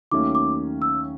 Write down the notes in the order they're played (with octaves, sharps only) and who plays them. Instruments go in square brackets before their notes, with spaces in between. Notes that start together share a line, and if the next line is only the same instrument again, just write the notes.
[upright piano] D#2 D#3 F#3 A3 C#4 [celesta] D6
[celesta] D6
E6